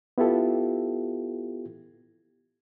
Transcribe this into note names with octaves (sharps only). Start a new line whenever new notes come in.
B3 E4 F4 G4 A4